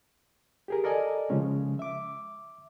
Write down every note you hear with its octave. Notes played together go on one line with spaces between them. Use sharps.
G4 G#4 A#4
A4 A#4 D5 D#5 G#5
C#3 F3 G#3 C#4
E5 D6